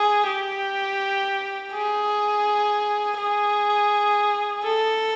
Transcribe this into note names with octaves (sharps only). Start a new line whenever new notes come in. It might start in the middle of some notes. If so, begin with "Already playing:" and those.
Already playing: G#4
G4
G#4
G#4
A4